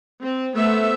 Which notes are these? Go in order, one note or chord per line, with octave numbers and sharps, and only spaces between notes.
C4
A3 B3 C5 E5